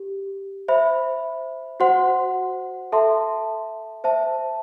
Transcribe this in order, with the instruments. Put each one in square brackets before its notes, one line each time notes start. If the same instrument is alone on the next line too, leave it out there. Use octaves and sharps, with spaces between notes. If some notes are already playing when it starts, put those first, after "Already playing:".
Already playing: [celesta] G4
C5 E5 B5
F#4 C5 F#5 C6
A4 E5 A5 C6
C5 E5 A5